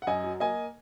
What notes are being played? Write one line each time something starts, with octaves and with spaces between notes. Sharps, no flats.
F#5
F#2 D#5 G#5
F#3
A#3 D#5 G#5